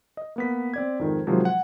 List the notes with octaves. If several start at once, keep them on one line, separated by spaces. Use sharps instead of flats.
D#5
A#3 B3 B6
C4 D5 G#6
F2 G#2 D#3
C3 D#3 F3 F#3 G#3
F#5